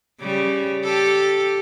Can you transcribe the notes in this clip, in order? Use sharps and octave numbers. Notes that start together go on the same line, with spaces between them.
C#3 G3
G4 A4